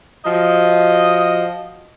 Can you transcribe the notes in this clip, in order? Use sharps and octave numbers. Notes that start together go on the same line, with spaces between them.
F3 F#4 D#5